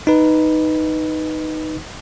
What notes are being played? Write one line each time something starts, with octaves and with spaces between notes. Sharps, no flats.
D#4 B4